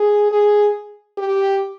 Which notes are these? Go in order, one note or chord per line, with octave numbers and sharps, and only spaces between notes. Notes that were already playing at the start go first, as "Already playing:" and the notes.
Already playing: G#4
G#4
G4